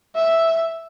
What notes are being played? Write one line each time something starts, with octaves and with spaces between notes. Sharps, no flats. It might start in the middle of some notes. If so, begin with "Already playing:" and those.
E5